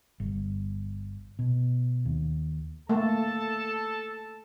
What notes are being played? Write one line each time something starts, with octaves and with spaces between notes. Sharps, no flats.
G1
B2
D#2
A3 A#3 A4 A5